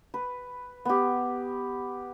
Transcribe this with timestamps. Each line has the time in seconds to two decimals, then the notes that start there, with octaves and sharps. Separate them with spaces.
0.14 B4
0.85 B3 G4